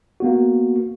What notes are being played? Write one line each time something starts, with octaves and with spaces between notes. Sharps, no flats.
A#3 B3 F#4